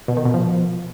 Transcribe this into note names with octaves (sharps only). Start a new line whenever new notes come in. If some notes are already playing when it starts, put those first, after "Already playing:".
B2
D#3
B2
F3